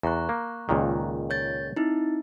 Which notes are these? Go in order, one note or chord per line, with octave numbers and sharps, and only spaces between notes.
E2 A#5 C#6 F#6
A#3
C#2 A#2 D#3
C#5 G6 A6
C4 D#4 E4